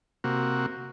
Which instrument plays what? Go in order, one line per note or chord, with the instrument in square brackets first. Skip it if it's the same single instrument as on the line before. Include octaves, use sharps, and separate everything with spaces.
[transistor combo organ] C3 A#3 F#4